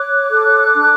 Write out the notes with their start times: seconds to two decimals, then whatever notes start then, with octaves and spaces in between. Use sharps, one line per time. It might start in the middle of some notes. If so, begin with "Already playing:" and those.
Already playing: C#5 D6 F#6
0.30 A4
0.74 D4